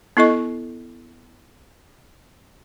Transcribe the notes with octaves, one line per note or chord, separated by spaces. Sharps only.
B3 E4 A4 D#5 C#6